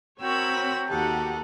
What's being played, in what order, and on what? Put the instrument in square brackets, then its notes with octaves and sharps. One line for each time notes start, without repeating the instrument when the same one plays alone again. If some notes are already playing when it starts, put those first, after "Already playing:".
[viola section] C4 A#4 C#5 [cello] F#4 [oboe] G5 [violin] B5 E6
[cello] D#2 A4 [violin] D#4 [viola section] F#4 G4 F#5